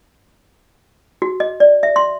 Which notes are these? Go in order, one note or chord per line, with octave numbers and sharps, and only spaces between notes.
F#4
D#5
D5
E5
C6